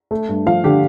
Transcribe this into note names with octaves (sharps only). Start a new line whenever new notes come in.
A3
G2
F3 F5
D3 G4